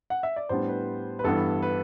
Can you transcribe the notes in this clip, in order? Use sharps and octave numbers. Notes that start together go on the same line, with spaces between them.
F#5
E5
D5
A2 G3 B3 D4 C5
B4
B4
G2 E3 B3 D4 A4
B4